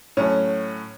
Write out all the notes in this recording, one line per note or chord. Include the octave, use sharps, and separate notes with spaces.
A2 F#3 A3 C#4